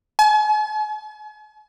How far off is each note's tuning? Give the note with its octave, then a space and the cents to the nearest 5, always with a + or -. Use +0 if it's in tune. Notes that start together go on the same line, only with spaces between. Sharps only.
G#5 +40